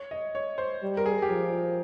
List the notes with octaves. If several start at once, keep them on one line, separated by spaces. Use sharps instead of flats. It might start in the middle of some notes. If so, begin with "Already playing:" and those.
Already playing: C#5
D#5
C#5
C5
G3
A#4
G#4
G4
F3 G#4